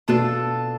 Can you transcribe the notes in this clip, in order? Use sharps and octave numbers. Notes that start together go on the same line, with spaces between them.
B2 D4 F4 A4